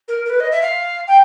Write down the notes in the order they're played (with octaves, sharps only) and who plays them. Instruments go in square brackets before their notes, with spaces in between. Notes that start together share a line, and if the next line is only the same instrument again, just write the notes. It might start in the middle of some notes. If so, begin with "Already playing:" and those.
[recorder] A#4
A#4
B4
D#5
E5
F5
G5